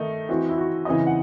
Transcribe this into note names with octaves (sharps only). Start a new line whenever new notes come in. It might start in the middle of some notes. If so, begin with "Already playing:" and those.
Already playing: D#3 A3 D#4
E3 C4 D#4 F#4
E4
F#4
C#3 E3 C4 D#4 D#5
F#5